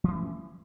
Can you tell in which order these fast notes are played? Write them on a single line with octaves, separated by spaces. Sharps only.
F3 E3 A3 C#4